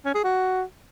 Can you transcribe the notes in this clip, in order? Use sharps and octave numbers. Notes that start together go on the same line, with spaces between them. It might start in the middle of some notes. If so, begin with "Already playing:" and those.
C#4
G#4
F#4